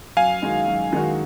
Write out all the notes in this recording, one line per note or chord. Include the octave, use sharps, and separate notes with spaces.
F#2 F5 G#5
D#3 G#3 D#4 F#4
F#2
D#3 G#3 D#4 F#4